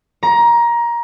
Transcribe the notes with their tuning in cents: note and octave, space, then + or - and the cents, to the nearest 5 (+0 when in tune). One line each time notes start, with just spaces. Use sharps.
A#5 +20